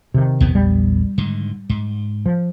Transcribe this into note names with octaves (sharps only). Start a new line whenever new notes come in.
C3 D#3
A#1 E2 B3
G3
G#2 D3 D#3
G#2
F3